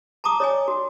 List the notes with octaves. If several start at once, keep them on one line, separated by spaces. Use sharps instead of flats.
A5 A#5 D6 D#6
C#5 D#5 G#5
F#4